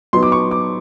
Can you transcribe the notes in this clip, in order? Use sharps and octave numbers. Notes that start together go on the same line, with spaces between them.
F#3 B3 D#4 C6
D6
C#6
D6